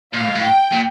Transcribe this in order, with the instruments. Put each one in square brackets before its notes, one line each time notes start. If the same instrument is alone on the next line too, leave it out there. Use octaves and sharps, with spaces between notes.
[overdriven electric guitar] A#2 [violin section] F5
[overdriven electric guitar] A2
G#2
A2
[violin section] G5
[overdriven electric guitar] A#2